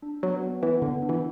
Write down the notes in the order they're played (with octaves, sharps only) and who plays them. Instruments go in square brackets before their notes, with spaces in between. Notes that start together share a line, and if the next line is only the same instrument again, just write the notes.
[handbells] D4
[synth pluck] F#3 [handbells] B3
[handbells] B3
[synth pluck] E3 [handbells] B3
[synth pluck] D3 [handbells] B3
[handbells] D4
[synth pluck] E3